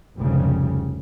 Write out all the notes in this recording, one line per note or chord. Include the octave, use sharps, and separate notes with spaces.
F1 C2 F2 G#2 C#3 G3